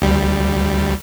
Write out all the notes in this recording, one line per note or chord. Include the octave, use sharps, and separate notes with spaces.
D2 G3